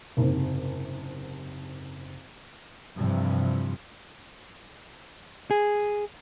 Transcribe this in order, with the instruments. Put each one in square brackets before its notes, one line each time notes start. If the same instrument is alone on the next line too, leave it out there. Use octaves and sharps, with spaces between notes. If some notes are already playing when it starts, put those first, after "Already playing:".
[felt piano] F#1 G#2 C3
[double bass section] G2 C3 E3 F3
[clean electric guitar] G#4